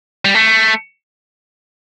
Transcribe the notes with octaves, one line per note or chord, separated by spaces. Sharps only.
G3
A3